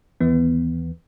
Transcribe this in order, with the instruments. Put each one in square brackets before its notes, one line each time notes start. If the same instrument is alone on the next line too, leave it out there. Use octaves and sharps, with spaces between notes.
[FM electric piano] D#2 E3 B3